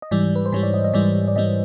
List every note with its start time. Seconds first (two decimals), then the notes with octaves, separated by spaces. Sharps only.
0.02 D#5
0.11 G#2 E3 G3 D5
0.36 B4
0.46 C5
0.53 G#2 E3 G3 C#5
0.63 D5
0.74 D#5
0.84 D#5
0.94 G#2 E3 G3 D5
1.28 D5
1.36 G#2 E3 G3 D#5